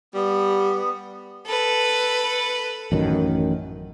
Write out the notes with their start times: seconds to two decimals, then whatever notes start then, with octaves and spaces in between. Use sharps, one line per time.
0.15 G3 B3
1.47 A4 B4
2.92 A1 F#2 D#3